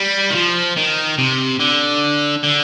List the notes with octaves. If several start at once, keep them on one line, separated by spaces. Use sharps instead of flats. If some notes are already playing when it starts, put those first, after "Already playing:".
Already playing: G3
D#3
F3
D#3
C3
D3
D3